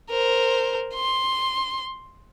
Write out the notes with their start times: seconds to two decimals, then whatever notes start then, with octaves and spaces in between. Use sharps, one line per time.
0.10 A#4 C5
0.95 C6